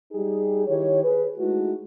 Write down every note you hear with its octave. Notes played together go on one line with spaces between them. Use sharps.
G3 D#4 G4 G#4
D#3 E4 G4 C#5
G#4 B4
G#3 A3 D#4 E4 F#4